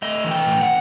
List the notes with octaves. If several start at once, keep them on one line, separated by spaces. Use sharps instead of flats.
A3 D#5
E3
G5
A2
F#5